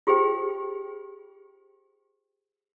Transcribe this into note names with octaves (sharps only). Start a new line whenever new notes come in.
F4 G4 G#4 C5 G5